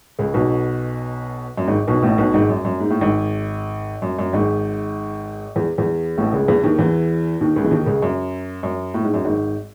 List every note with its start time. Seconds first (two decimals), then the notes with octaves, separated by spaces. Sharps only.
0.19 C#2 C#3
0.34 B1 B2
1.58 F#2
1.67 G#1 G#2
1.87 B1 B2
2.02 A1 A2
2.18 B1 B2
2.34 G#1 G#2
2.49 F#2
2.65 F#2
2.80 G#2
2.90 A2
3.01 G#1 G#2
4.02 F#2
4.19 F#2
4.33 G#1 G#2
5.56 E2
5.78 E2
6.17 A1 A2
6.33 C#2 C#3
6.48 E2 E3
6.64 D#2 D#3
6.79 E2 E3
7.41 D#2 D#3
7.56 C#2 C#3
7.64 E3
7.71 D#2 D#3
7.86 C#2 C#3
8.02 F#2
8.63 F#2
8.94 A2
9.04 G#2
9.14 F#2
9.25 G#1 G#2